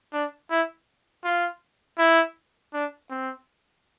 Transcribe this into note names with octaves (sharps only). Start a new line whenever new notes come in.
D4
E4
F4
E4
D4
C4